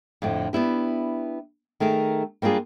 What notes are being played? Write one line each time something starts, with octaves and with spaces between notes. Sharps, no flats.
F2 A2 D3
B3 D4 E4 G4
D#3 A3 G#4 A#4
G3 A#3 D4 F4 G#4